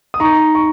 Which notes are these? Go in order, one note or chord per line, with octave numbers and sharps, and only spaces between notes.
D#6
D#4 A#5 C#6
C#6